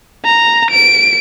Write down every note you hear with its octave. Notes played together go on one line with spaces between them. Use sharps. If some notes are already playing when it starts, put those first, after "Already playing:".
A#5
D7